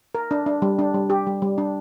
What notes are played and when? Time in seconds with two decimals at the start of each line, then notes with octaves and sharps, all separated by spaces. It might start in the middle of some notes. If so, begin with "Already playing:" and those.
0.15 A#4
0.31 D4
0.46 D4
0.62 G3
0.79 D4
0.94 G3
1.10 G4
1.27 G3
1.42 G3
1.58 D4